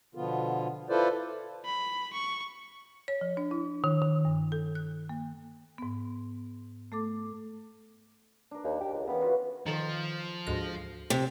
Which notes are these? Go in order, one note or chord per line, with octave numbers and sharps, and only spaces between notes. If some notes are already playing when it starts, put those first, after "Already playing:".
B2 D3 F3 B3 F4
E4 F4 A4 B4 C5 D5
B5
C#6
C#5
F3
D4
E4
D#3
D#3
G2
A4
F#6
A#3
G#2 B3
A3 A4 D6
D4 A#4
D#2
G4
C#2
C#3 E3 B3
F4 F#4 B4
D#3 F3 A4
D2 G#2 A#6
C3